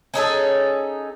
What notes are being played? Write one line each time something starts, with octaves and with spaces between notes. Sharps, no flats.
C#4 D#4 G#4 A4